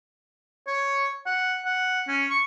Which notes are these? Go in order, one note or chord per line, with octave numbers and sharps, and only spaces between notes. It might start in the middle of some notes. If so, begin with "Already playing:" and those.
C#5
F#5
F#5
C#4
C#6